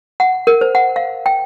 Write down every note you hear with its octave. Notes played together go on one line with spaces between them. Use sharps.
F#5
A#4
C5
F#5
F5
G5